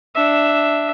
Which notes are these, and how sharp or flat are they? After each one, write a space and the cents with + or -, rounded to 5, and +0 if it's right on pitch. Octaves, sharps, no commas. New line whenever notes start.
D4 +0 E5 +0